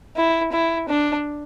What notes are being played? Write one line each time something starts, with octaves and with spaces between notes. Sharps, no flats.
E4
E4
D4